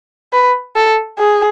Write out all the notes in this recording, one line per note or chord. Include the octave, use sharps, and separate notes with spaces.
B4
A4
G#4